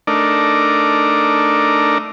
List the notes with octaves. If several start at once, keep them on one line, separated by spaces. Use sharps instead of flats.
A3 D4 D#4 A#4 D5